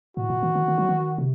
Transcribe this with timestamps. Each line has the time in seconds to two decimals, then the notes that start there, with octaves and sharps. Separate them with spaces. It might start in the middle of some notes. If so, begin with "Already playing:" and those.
0.17 A2 F#4
0.30 A#2
0.43 D#3
0.55 D#3
0.68 D#3
0.78 F#3
0.89 D#3
1.18 C3